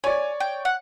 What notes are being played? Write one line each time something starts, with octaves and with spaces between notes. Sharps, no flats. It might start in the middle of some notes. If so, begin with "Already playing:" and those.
C#5 D5 G#5
G5
F#5